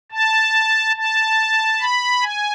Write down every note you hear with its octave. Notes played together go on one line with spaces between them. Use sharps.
A5
A5
B5
G#5